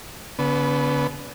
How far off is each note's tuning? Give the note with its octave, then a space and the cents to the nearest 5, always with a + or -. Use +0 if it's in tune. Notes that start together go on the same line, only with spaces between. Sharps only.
D3 -45 B3 +0